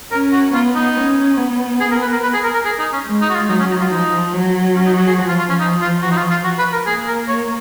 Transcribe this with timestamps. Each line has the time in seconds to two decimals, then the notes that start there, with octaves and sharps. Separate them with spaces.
0.12 C#4 A#4
0.33 F#4
0.54 B3 F4
0.75 D#4
0.97 C#4
1.38 B3
1.80 G#4
1.91 A#4
2.02 B4
2.12 A#4
2.23 B4
2.33 G#4
2.44 A#4
2.54 A#4
2.65 G#4
2.79 D#4
2.93 C#4
3.07 G#3
3.21 D#4
3.30 F#4
3.35 F4
3.49 F#3 D#4
3.60 C#4
3.70 D#4
3.81 F4
3.91 F3 D#4
4.33 F#3
4.76 C#4
4.86 D#4
4.97 F#4
5.07 G#4
5.18 F3 F#4
5.28 F4
5.39 F4
5.49 C#4
5.60 F3 D#4
5.81 F4
6.02 F#4
6.11 D#4
6.17 F4
6.30 F4
6.44 F#4
6.58 B4
6.73 A#4
6.87 A#3 G#4
7.08 A#4
7.28 C#5